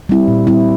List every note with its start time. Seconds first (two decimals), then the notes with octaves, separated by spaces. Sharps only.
0.09 G3 C4 E4
0.28 A#2
0.47 G3 C4 E4